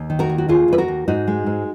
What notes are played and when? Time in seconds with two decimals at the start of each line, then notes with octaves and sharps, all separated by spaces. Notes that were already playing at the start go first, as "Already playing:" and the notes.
Already playing: D#2
0.10 D#3
0.19 F#4 A#4
0.30 D#2
0.38 F#4
0.48 D#2 F4 G#4
0.68 D#2 B4
0.78 F#4 A#4
0.88 D#2
1.08 G#2 D#4 F#4
1.27 G#3
1.46 G#2